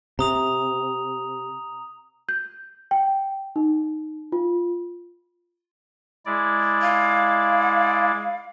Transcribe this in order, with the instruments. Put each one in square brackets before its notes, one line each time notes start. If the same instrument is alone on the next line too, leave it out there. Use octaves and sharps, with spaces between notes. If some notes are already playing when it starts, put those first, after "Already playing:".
[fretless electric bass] C3 [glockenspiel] A#5 D#6 F7
[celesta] G6
G5
D#4
F4
[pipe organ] G#3 E4 D5
[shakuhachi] F5